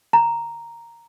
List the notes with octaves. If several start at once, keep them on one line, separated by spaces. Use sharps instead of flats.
A#5